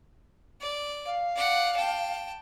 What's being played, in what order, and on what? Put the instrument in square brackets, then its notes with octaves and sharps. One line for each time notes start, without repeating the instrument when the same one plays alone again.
[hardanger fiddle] D5
[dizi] F5
[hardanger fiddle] D5 F#5
G5 A5